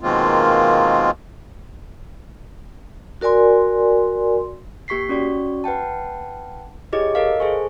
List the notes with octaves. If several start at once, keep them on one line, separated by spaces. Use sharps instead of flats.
B2 D#3 G#3 A#3 C4 F4
F#4 A#4 D5 G#5 C6
A#3 G4 C#6 B6 C7
C#4 F#4 D5 C#6
B4 F#5 G5 A5
E4 G4 G#4 C#5 D#5 D6
A4 A#4 D#5 F5
G#4 A4 C5 G#5 C#6